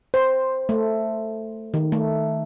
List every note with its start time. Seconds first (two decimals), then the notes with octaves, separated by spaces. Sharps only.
0.14 C5
0.69 A3
1.74 D#3
1.92 A3